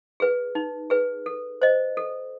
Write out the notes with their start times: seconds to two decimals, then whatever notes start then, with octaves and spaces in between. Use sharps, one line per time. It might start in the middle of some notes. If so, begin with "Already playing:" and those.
0.20 G#4 B4
0.55 D#4
0.90 G#4 B4
1.26 A4
1.62 C5 D#5
1.97 A4